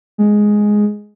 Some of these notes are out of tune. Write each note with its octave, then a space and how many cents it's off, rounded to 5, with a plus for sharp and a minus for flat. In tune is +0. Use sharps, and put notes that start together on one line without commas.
G#3 +5